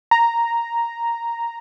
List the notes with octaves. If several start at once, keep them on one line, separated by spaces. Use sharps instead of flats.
A#5